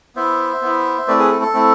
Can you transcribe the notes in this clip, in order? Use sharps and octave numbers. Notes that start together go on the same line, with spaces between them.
B3 E4 C5 E5
B3 E4
A3 C4 E4 B4 D5
G#4 B4
A4
A4
A3 C4 E4